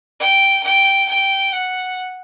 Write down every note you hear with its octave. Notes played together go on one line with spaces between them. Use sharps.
G5
G5
G5
F#5